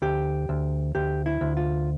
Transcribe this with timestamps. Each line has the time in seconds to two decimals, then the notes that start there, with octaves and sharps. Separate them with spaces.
0.02 D2 G4
0.49 D2
0.95 D2 G4
1.26 E4
1.41 D2
1.57 F4